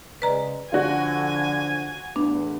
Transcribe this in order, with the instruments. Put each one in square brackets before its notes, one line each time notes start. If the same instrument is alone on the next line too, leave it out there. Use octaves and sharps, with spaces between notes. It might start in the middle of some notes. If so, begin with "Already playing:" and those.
[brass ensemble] C#3 G#3 [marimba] B4 D5 A#5
[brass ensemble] D3 F3 [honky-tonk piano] F4 F#4 [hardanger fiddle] G#5
[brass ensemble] A1 E2 [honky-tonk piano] B3 [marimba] D4